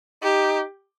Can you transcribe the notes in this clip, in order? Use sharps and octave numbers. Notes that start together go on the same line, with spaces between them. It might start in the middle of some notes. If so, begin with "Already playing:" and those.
D#4 G4